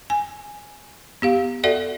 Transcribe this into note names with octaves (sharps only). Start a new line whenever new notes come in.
G#5
B3 G4 F5
F#4 A4 D5 E5 F#5